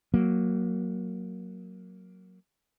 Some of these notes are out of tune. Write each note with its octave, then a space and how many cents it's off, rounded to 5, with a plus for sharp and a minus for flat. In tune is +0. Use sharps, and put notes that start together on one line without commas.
F#3 +0 A#3 +0